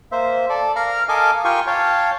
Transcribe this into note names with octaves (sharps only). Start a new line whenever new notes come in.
A#3 C5 E5
A4 D5
A#4 F5 A#5 F6
A4 A#4 D#5 F5 G#5 D6
F4 G4 A#4 G5 G#5 C#6
C#5 F5 G5 A5